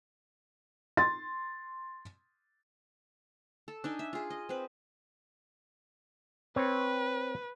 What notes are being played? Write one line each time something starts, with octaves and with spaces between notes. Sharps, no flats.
C6 A6
A4
D4 D#4 G#5
E5
F4 G#4
D#5
C4 B4
C4 B4 C#5